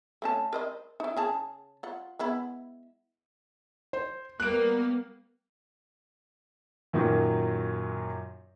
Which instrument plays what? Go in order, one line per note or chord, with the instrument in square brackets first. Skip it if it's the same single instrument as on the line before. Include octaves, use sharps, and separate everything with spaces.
[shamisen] A3 C#4 A5
A#4 C5 D#5
D#4 E4
C#3 G#4 A5
F4 F#5
G#3 B3 E4
[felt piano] C5
[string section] G3 A#3 B3 [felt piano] F#6 D7
[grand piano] F#2 A#2 D#3 F#3